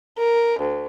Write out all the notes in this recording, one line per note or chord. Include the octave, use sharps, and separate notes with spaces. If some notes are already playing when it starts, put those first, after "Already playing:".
A#4
D2